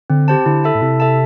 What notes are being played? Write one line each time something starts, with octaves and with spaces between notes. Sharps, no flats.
D3 C4
G4 C5 A5
D3 E4
A4 E5 A5
A2
C3 E4
A4 E5 A5